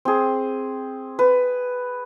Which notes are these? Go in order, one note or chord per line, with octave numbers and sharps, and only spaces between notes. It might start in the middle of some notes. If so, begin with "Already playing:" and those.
C4 G#4
B4